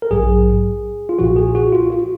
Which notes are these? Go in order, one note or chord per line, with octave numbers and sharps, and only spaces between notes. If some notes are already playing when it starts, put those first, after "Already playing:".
A#4
A#1 G#2 F#3 G#4
F4
B1 A#2 F3 F#4
G#4
F#4
F4
F#4